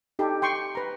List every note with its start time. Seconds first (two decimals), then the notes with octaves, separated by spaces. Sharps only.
0.19 D#4 G4 A4
0.42 G5 C6 C#6
0.75 B4 A#5